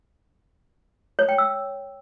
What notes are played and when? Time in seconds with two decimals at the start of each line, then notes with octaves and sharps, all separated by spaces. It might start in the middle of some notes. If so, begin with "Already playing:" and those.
1.19 C#5
1.29 G5
1.38 E6